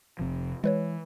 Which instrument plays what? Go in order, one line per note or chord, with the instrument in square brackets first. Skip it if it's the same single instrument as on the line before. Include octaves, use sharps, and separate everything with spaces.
[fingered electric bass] F1 C3 F3
[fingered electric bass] E3 [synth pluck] G#3 B4 C#5